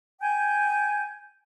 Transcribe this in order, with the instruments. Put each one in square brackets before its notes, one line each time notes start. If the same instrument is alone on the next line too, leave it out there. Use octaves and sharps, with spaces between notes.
[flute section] G5 G#5 G6